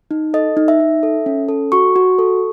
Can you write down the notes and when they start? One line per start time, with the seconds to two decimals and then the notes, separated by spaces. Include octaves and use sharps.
0.11 D#4
0.34 A4 D#5
0.57 D#4
0.68 E5
0.80 D#4
1.03 A4
1.26 C#4
1.48 A4
1.72 F#4 C#6
1.96 F#4
2.18 A4